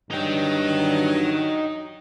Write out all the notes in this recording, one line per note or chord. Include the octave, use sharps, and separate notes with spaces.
G2 F#3 D#4 G5